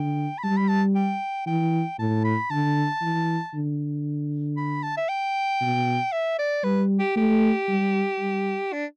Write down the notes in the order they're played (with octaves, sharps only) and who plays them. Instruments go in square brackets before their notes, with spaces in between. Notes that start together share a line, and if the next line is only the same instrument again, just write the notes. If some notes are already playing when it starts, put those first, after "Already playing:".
Already playing: [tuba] D3 [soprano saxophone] G5
[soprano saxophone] B5
[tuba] G3 [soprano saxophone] A5
[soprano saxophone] B5
A5
G5
[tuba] E3 [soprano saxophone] G5
[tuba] A2 [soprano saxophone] A5
[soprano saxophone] B5
[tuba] D3 [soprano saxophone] A5
[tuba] E3
D3
[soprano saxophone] B5
A5
E5
G5
[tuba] B2
[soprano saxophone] E5
D5
[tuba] G3 [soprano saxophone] B4
[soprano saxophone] G4
[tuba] A3 [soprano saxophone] G4
[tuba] G3
G3
[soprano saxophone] D4